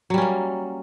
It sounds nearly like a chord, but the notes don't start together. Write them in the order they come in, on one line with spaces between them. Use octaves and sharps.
F#3 G3 C#4 A#3